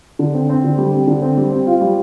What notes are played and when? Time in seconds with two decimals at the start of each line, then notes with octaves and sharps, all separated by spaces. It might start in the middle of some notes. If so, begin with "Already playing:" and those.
0.19 D3
0.34 C4
0.49 C4
0.64 D3
0.78 G3
0.93 C4
1.07 D3
1.22 C4
1.37 G3
1.52 C4
1.67 F4
1.81 G3